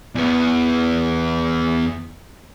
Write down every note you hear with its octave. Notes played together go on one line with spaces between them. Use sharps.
E2 B3